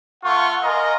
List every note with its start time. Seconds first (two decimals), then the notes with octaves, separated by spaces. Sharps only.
0.24 A3 F4 F#5 C#6
0.64 A#4 D#5 F5 G#5 A#5 C6